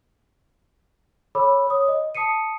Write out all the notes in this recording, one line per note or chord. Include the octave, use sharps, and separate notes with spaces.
A4 C#5 B5 D6 E6
C#5 D#6
D#5
A5 D#6 C7 C#7 D#7